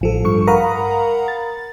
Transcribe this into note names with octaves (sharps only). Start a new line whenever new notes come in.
A1 F3 A4
G2 C#6 C#7
A#4 F5 F#5 A#5 B5 D#6
A6